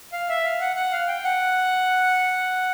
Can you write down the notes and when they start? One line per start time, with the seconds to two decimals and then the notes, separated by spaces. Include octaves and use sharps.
0.12 F5
0.29 E5
0.44 F5
0.61 F#5
0.76 F#5
0.92 F5
1.08 G5
1.24 F#5